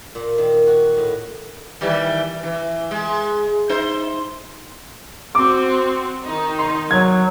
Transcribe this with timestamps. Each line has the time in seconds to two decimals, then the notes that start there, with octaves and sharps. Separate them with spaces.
0.15 A#2
0.38 D#3
0.67 F#4
0.97 A2
1.81 D#3 E3 G3
2.43 E3
2.91 G#3
3.69 D#4 C5
5.35 C4 F#4 D6
6.25 D#3 D#4
6.59 C6
6.91 F#3 G#6